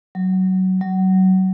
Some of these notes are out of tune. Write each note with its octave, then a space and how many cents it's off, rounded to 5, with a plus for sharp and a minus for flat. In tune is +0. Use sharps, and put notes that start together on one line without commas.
F#3 +15
F#3 +25